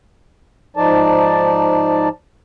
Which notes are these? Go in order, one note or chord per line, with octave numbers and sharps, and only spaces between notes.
G#2 F3 D#4 D5 A5